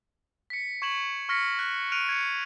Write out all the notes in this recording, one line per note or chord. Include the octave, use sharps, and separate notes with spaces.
B6 C#7
C#6 G#6 E7 F#7
C#6 F6 A#6 B6 C#7
F#6
F6 F#6 D7 D#7 F7
G#6 C#7